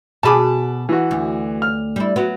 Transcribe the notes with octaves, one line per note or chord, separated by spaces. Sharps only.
B2 G#4 A5 B5 D6
E3 F#4
D2
F6
G3 E4
F#3 B3